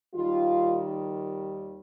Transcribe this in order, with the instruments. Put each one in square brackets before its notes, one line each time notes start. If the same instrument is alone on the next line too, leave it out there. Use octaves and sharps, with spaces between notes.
[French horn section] D#2 D#3 G3 F4